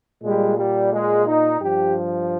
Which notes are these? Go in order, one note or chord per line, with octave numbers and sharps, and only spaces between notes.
A#2 G3 G#3
G3
G#3
D#4
G2 F3 G4